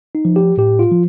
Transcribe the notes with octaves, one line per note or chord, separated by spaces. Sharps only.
D#4
F3
G4
A2 G4
F4
F3